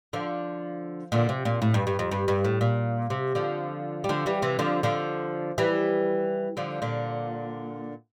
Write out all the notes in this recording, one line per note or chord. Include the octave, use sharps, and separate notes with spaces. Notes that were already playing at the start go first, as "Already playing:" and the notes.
D3 F3
A#2 D3
C3
A#2
A2
G2
G2
F2
G2
G2
A2
A#2
C3
D3 F3
G3
D3 F3
E3 G3
C3 E3
D3 F3
D3 F3
E3 G3
D3 F3
A#2 D3